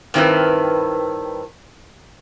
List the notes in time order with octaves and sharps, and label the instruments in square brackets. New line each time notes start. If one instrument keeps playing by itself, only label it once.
[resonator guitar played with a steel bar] G2 D#3 C4 E4 A#4 B4